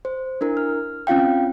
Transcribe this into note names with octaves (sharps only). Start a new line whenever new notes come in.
C5
D4 E4 A#4
F6
C4 C#4 F4 F5 G5